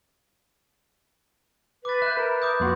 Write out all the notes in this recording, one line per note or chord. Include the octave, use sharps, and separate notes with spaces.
B4 D6 A6
E5 F#6 G6
A#4 B4 B5
B5 D6 D#6 G6
F2 A#3 F#4 B4 F#5 C6